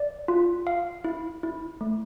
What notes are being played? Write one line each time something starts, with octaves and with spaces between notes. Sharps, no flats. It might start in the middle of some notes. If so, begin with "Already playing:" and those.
Already playing: D5
F4
F5
E4
E4
A3